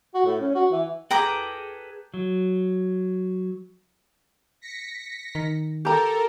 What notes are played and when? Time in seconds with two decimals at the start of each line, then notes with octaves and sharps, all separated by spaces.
0.14 F#4
0.26 A2
0.41 C#4
0.55 F#4
0.72 E3
1.11 G#4 A4 B4 G5 A#5 D6
2.14 F#3
4.61 A#6 B6 C#7
5.35 D#3
5.85 G4 A4 A#4 A#5